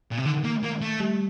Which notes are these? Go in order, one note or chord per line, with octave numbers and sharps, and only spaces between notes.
A#2
C3
D3 D#3
A#3
A#3
A3
G3